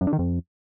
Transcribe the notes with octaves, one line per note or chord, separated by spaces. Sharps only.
F#2
D3
D#3
F2